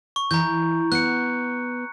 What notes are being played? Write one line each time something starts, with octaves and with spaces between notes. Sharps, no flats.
C#6
E3 A#5 G6
B3 F#6 C#7